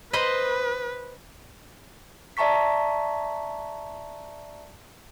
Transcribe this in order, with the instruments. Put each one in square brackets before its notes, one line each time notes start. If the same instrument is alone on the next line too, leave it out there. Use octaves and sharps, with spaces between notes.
[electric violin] B4 [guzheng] C5 D#5 B5
[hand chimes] D5 E5 A5 A#5 C#6 B6